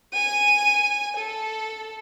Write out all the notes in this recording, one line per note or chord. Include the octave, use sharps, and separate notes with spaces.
G#5 D#7
A4